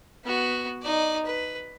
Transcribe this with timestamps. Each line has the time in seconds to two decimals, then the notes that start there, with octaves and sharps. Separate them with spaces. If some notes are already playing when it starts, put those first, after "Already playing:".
0.24 B3 F#4
0.82 D#4 D5
1.26 B4